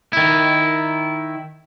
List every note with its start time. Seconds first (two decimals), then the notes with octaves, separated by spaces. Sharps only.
0.13 D#3 E4